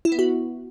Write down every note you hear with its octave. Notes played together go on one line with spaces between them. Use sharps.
E4
B3
F#4